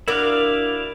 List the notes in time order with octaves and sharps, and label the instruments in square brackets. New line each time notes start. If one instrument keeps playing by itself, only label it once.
[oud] D4 F#4 A#4 [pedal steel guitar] E4 D5 F5